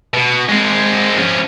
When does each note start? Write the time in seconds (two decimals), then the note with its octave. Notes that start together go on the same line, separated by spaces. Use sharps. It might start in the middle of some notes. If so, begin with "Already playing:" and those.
0.14 B2
0.49 G#3 C4
1.17 F3 C#4